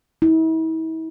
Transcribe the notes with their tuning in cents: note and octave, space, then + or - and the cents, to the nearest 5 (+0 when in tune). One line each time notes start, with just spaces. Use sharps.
E4 -40